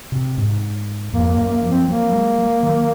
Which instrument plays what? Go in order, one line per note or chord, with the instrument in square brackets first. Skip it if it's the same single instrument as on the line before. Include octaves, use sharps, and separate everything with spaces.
[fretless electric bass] C3
G#2
[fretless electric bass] F2 [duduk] A#3
[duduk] A#3
[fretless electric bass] F#2
[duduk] A#3
[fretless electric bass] F3
[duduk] C4
[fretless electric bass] F#3 [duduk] A#3
[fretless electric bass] G#3
F#3
D#3